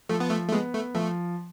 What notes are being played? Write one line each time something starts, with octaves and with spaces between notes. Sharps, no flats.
F3 A3
B3
A3
A3
G#3 B3
A3
F3 A3